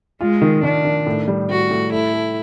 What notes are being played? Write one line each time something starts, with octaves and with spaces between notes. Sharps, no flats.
G#3 F4
D#3
D#3 D4
D#3
A2
G3
A2 F#4
A2
A3 E4
A3